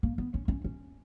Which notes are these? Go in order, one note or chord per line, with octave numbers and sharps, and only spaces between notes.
A#3
B3
C#4
C#4
C#4